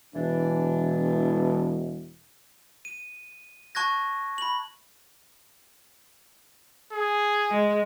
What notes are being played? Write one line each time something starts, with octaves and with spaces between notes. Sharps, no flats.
E1 E3 D4
D#7
A5 C#6 F#6 G#6 A#6
B5 F#7
G#4
G#3